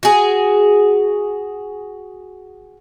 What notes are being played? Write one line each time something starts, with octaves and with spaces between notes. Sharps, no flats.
F#4 G#4